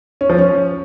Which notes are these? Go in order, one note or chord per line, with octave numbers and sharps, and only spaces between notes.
C#4
F3
C#4